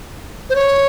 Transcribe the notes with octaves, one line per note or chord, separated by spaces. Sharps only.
C5
C#5